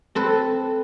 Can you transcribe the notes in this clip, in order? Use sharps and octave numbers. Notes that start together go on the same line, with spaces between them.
C4 A4 B4 C5